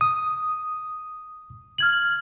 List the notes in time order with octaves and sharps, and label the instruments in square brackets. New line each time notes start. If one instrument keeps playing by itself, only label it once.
[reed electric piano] D#6
[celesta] F6 G#6 F#7